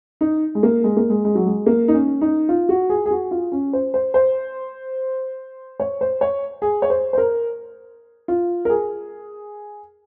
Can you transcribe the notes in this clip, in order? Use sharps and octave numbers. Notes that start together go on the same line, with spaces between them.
D#4
G#3
A#3
G#3
A#3
G#3
G#3
F#3
G#3
A#3
D#4
C#4
D#4
F4
F#4
G#4
G#4
F#4
F4
C#4
C5
C5
C5
C#5
C5
C#5
G#4
C#5
C5
C5
A#4
F4
A#4
G#4